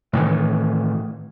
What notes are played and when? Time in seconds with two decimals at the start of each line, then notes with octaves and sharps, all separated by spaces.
0.13 A2 D#3 E3